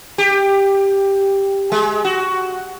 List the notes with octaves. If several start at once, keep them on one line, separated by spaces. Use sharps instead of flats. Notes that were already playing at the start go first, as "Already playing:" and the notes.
G4
G#3
F#4